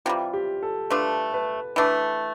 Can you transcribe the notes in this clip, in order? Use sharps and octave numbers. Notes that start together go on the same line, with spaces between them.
C3 E3 G3 F4
G4
A4
A3 D4 F4 B4
B4
E3 A3 D4 B4